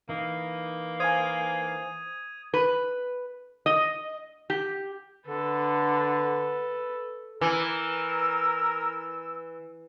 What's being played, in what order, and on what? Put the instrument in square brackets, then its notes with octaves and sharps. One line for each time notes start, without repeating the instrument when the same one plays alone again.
[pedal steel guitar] E3 D#4 [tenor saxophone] A#3
[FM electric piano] C5 F5 G#5 [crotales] D#6 G#6 D#7
[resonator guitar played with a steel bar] B4
D#5
G4
[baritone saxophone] D3 [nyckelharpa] A4 B4
[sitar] E3 [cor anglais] A#4 [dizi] E6